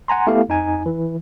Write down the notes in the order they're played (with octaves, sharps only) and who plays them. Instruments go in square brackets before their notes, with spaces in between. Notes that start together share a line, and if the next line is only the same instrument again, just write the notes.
[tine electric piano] F#5 G#5 A#5 C6
A3 B3 E4 G4 A4 F5
F2 D#4 G#5
E3